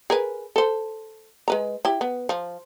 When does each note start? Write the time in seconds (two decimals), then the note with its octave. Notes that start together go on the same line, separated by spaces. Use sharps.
0.10 G#4 A#4 B4
0.56 A4 C5
1.48 G#3 B4 A#5
1.85 E4 G4
2.01 B3
2.29 F3